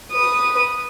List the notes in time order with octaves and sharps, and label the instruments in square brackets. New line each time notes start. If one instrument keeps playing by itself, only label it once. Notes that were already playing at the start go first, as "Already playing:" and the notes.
[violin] B4 D#6